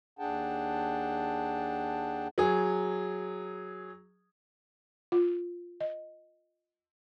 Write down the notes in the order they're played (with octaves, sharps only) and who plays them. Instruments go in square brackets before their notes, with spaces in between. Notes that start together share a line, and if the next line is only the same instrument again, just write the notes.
[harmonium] D#2 D4 G#4 F#5 G5 A5
[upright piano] F#3 G#4
[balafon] F4
D#5